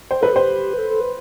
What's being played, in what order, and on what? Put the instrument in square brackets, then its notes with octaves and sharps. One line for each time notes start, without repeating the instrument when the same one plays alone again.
[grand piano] C5 [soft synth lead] G5
[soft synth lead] A4 [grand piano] B4
[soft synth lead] G4 [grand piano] C5
[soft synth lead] B4
A4
A4
B4